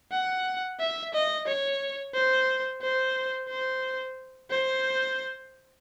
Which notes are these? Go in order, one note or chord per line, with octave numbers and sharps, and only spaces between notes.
F#5
E5
D#5
C#5
C5
C5
C5
C5